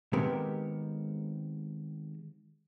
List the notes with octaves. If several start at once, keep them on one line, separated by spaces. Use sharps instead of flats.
D#3 G#3 B3 C4 G4 A#4